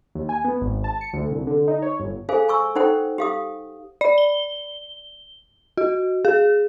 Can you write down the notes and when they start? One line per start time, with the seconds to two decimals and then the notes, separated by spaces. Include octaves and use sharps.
0.15 D#2
0.29 G#5
0.45 B3
0.61 G#1
0.84 A5
1.01 C#7
1.13 D2
1.31 C2
1.47 D3
1.68 D#4
1.82 C#5
2.00 G1
2.29 G#4 A4 C5 F5 G#5
2.49 G#5 C#6 E6
2.76 D#4 A4 C5 F#5 G5
3.18 G4 F5 D#6
4.01 D5
4.18 G7
5.77 F#4
6.25 G#4